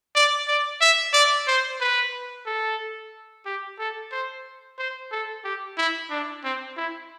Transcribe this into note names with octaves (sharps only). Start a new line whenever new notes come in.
D5
D5
E5
D5
C5
B4
A4
G4
A4
C5
C5
A4
G4
E4
D4
C4
E4